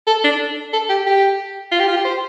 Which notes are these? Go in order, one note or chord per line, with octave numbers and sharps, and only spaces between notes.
A4
D4
A4
G4
G4
F4
G4
F4
G4
C5